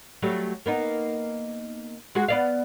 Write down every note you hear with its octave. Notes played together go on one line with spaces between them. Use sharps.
F#3 G3 A3
A#3 B3 D#4
G#3 F#4 G#4
B3 D5 F5